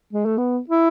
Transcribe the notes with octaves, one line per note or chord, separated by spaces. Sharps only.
G#3
A3
B3
E4